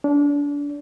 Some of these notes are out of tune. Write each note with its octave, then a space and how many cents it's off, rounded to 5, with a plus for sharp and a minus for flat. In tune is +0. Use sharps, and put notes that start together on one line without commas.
D4 -30